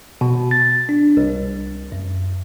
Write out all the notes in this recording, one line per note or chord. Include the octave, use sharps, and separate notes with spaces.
B2
A6
D4
C2
F#2